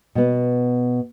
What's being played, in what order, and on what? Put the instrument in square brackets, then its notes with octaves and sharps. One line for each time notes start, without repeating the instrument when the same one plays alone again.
[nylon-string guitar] B2 B3